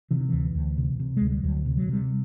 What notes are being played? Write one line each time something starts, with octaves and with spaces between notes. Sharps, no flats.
C3 E3
D#3
D2 E3
D2
C3
C3
D2 G#3
G3
D2 F#3
C3
F#3
C3 G3